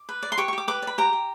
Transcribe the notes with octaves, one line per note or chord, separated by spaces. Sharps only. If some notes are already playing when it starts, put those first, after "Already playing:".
Already playing: D6
B4
D5
C6
G4 C#6
C#6
G4 D6
B4 D6
D5
B5
G4 A#5
G4